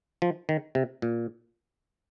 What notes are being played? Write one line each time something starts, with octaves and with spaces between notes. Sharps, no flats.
F3
D#3
C3
A#2